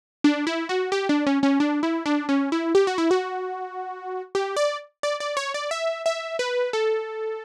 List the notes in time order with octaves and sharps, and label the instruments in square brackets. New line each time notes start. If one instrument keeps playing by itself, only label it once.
[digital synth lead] D4
E4
F#4
G4
D4
C#4
C#4
D4
E4
D4
C#4
E4
G4
F#4
E4
F#4
G4
D5
D5
D5
C#5
D5
E5
E5
B4
A4